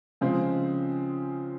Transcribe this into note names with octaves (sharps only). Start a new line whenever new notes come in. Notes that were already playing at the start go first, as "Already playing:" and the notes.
C#3 F3 G#3 C4